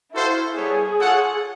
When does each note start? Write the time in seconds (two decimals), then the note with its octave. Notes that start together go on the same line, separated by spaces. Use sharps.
0.13 E4 F#4 A4 C5 F5
0.56 G3 B3 E4 G#4 A4 C#5
1.00 F4 A4 C#5 F#5